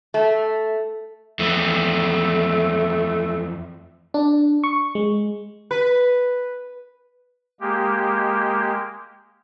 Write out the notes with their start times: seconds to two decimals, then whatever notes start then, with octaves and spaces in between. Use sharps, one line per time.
0.14 A3
1.39 F2 E3 A3
4.14 D4
4.64 C#6
4.95 G#3
5.71 B4
7.60 G#3 A#3 G4